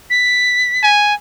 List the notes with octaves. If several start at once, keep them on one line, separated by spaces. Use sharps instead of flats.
B6
G#5